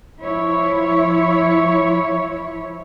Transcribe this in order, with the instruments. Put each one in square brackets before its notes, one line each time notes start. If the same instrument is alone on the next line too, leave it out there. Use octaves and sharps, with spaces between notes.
[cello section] F3 E4 C#5